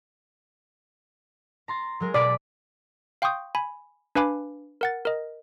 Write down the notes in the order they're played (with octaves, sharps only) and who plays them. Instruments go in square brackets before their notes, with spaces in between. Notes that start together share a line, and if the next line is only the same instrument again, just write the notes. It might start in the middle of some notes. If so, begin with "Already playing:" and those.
[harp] A#5 C6 A6
F#3 G#3 A#4
[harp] B2 B5 D6 [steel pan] D5
[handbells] F5 G5 C6 C#6 D#6 G6
G#5 B5
D4 B4 F5 G#5 B5 D6
A#4 F#5 A6
A#4 D#5